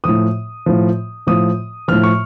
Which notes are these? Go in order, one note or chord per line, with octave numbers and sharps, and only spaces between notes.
A2 F3 D#6
A2 F3
A2 F3 D#6
A2 F3 F6
C#6